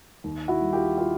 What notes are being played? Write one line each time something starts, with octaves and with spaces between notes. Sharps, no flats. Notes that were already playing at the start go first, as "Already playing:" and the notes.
D#2
E4 F#4
G3
F4 G4
F4 G4